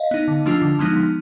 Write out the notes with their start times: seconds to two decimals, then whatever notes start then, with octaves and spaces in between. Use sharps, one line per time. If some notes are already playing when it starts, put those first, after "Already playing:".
Already playing: D#5 F5
0.11 B3 D#4
0.28 D3
0.46 F3 A3 D4 F4
0.62 D3
0.79 F3 G#3 B3 D#4
0.96 F3